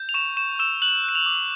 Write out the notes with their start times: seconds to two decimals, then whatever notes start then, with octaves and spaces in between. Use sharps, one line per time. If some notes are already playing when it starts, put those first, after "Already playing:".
Already playing: G6
0.09 F7
0.14 C#6 E7
0.37 C#6 E7
0.59 E6 E7
0.82 F#6 F#7
1.04 F#6 E7
1.15 F7
1.26 D6